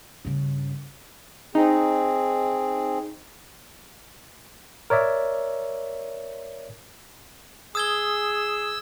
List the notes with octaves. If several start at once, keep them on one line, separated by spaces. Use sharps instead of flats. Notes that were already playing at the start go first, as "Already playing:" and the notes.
G2 C#3
C4 D#4 G#4
A#4 C#5 D5 E5
G#4 D#6 E6 G#6 G7